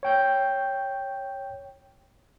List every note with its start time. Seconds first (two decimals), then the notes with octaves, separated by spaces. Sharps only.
0.03 C#5 G5 G6